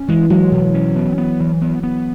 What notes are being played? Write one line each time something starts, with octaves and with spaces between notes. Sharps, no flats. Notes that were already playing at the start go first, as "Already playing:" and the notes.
Already playing: C#4
E3 G#3
F#3 G#3
B2
C#4
B3
B3
E3
B3
B3